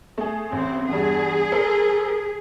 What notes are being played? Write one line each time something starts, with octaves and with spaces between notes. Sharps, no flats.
A3 G#4
A1 C4
E2 G2 G#4
A4 A#4 C5